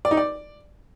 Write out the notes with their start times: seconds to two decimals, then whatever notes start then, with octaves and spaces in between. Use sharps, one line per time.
0.05 D5
0.11 D#4
0.17 D5